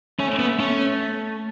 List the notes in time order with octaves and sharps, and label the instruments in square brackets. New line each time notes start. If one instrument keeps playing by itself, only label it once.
[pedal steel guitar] A3 [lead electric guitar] C#4
[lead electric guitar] B3
[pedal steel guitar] A3 [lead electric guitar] C#4